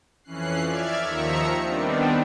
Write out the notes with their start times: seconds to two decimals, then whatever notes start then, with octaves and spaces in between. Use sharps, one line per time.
0.24 F2 E3 C#4 F#6 C7
0.63 D5 E5 F6 G#6
1.02 D#2 D#3 F3 E5 A#5 C#7
1.62 D#3 G3 B3 C4 D4